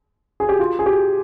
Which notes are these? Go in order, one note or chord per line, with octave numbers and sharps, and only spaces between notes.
G#4
G4
F4
G#4
G4